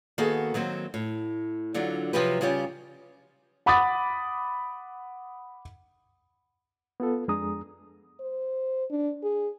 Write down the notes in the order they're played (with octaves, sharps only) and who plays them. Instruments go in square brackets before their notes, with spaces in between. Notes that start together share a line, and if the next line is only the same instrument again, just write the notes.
[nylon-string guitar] D#3 A#3 B3 F#4 G#4 A4
D#3 F#3 A#3 C4
A2
D3 F#3 D4 F4
C3 F3 F#3 C4 G4 B4
C#3 G3 C#4 F4 G4
[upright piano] F#5 B5 D6 D#6 A6
[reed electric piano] B3 F4 A4
F2 G#3 D4 G#4 A#5 D#6
[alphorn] C5
D4
G#4